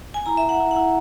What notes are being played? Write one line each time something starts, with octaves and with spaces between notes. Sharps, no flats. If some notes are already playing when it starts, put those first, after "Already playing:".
G#5
E4 A#5
E5
E4
F#5
E4
F#5
E4